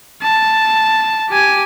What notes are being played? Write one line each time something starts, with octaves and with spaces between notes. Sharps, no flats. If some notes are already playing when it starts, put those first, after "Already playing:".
A5
G4 G#5